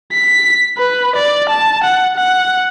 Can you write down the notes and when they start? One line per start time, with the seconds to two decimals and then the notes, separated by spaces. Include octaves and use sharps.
0.13 B6
0.78 B4
1.16 D5
1.49 A5
1.84 F#5
2.17 F#5